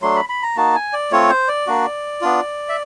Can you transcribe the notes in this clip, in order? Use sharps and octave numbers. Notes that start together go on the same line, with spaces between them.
F#3 A3 D4 C6
B5
B5
A#5
A#3 D#4 F#4 A5
G#5
D5
A3 C4 F4 C#5
C5
D5
A#3 D4 F#4
B3 D4 F4
E5